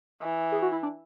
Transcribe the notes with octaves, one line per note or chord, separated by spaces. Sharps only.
E3
G#4
F#4
E4
D4